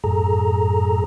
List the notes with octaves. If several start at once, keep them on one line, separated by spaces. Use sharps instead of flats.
F#2 A2 G#4 A4 A#5